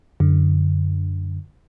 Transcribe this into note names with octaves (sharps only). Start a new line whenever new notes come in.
F#2 D3